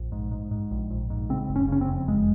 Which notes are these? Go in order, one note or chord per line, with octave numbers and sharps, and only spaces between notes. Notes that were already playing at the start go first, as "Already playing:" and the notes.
Already playing: A#1
G#2
G#2
G#2
A#1
A#1
G#2
C#3 C4
F#1
C#4
C#3 C#4
C4
F2
F#1 G#3